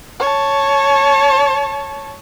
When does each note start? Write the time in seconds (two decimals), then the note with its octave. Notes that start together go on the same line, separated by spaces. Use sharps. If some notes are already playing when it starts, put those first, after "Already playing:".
0.20 C#5 A5